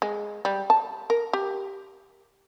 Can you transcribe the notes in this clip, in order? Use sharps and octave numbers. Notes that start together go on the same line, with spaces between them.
G#3
G3
A5
A#4
G4